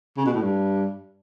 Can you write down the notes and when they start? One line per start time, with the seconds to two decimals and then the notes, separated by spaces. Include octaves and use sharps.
0.17 C#3
0.26 B2
0.34 A2
0.42 G2